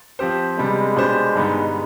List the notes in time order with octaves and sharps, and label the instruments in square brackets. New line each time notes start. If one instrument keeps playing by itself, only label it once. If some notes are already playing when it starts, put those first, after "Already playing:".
[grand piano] F3 C4 G4 C5
[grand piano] C3 G3 B3 D4 [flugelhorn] G#3
[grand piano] B2 B3 D4 G4 C5
G2 D3 G3 B3 D#4